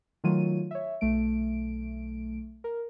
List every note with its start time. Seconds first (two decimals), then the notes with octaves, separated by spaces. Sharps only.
0.24 D#3 F#3 A3 F4 C#5 D#7
0.71 C#5 E5
1.01 B1 A3 D7
2.64 A#4